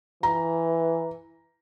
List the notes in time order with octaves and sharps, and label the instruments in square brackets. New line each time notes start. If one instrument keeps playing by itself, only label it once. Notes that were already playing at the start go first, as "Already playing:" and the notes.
[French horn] E3 [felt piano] A#5